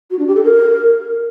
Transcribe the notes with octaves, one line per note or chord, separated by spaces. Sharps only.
F#4
D4
G4
A4
A#4